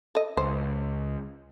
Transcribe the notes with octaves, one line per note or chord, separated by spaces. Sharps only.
A4 D#5
C#2 C5